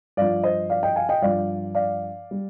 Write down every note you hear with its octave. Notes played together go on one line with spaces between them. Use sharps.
G2 F3 D5 F5
C5 D#5
D5 F5
D#5 G5
F5 G#5
D#5 G5
G2 F3 D5 F5
D5 F5
G3